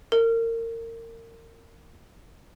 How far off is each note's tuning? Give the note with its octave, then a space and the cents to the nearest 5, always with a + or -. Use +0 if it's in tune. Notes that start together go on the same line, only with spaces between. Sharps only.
A#4 -30